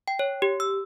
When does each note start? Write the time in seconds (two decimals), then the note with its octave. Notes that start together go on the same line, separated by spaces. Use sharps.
0.08 G5
0.19 C#5
0.42 G4
0.60 E6